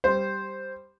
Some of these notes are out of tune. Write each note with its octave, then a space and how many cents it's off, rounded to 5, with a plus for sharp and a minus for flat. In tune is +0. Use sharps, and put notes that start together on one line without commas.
G3 +0 C5 +0